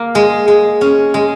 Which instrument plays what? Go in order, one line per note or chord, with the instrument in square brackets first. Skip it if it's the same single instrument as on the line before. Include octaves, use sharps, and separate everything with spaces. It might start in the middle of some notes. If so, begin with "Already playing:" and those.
Already playing: [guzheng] A#3
G#3
G#3
C#4
G#3